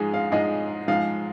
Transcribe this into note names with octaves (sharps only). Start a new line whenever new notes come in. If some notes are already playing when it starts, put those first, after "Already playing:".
Already playing: G#2 F3 G#3 D#4 G#4
F5
G#2 F3 G#3 D#4 D#5
G#2 F3 G#3 D#4 F5